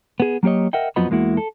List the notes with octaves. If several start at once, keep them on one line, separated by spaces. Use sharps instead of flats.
B3 G#4
F#3 A#3 G4 C#5 D#5
A#4 D#5 E5 F#5 G5
F2 F3 F#3 B3 D#5 B5
E2 G#3 A#3 E4 F#4
A4